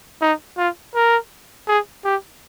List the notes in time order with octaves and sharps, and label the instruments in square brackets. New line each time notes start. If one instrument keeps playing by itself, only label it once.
[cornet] D#4
F4
A#4
G#4
G4